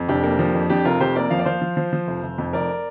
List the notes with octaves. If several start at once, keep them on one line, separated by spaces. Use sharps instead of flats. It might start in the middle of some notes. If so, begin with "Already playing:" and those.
Already playing: F2
F1 D4 G4
A#3
F3
F2
F2 D4 G4
F1 F4 A#4
F2 G4 C5
A#3 A#4 D5
F3 F5
D5
F3 C5 F5
F3
F3
F3
F1
F1
F2
F1 A#4 D5